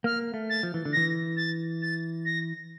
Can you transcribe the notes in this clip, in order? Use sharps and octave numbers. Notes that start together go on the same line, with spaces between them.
A#3 F6
A3
A6
F3
E3
D3
E3 A#6
A6
A6
A#6